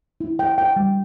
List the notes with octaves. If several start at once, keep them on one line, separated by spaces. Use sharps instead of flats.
E4
G5
G5
G3